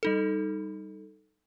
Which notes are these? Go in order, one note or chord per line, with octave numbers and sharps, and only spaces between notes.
G3 D#4 A4